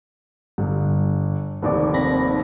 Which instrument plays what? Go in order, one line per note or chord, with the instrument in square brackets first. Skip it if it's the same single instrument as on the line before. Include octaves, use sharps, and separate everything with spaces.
[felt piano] G1 [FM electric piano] G2
[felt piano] F1 D#2 [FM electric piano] B4 D5
[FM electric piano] C4 B5 A#6